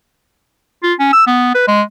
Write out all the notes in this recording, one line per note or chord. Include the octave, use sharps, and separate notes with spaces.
F4
C#4
E6
B3
B4
G#3